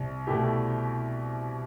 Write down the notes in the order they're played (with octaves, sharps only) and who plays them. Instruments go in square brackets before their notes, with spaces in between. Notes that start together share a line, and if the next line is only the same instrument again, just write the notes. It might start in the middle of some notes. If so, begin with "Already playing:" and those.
Already playing: [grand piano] C2
B2 A3 E4 G4